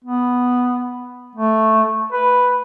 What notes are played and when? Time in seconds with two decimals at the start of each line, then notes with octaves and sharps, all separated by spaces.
0.04 B3
1.35 A3
2.12 B4